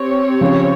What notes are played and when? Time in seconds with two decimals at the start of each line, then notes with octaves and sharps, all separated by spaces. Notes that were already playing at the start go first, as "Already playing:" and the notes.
Already playing: C4 G4 C#5
0.41 C#3 F3